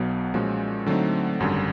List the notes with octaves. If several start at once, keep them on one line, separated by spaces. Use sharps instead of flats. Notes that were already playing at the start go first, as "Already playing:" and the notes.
Already playing: B1 B2 F#3 B3
A#2 F3 G#3 C#4 F#4
D3 F#3 A3 C4 D#4
G#1 F#2 D3 G3